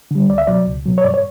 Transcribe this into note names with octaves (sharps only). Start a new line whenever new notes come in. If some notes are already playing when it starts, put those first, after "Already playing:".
D3 G3
C#2 D5
E5
B2 F#3 D5
C#2
B2 F#3
C#5
G2 D5
C#5